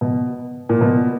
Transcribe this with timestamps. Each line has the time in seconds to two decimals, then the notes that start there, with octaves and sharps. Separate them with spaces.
0.01 B2
0.69 A#2
0.81 B2